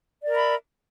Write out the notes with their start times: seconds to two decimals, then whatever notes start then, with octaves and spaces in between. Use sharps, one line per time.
0.22 D5
0.27 A#4
0.31 E5
0.35 B5